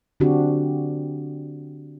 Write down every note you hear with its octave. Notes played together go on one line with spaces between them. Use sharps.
D3 C4 D4 F#4 G4